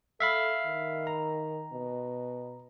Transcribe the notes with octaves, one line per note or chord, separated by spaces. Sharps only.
A4 E5 F5 B5
D#3
A#5
B2